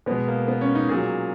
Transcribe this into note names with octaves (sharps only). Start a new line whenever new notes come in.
B2 G#3 B3
A#3
B3
C#4
D#4
A#2 F#3 G#4